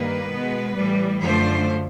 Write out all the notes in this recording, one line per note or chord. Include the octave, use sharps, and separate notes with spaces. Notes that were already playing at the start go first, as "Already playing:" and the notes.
Already playing: G2 D#3 G3 A#3 B4
B2 G#3 B3
A2 E3 G3
F#2 D3 F3 A3 C5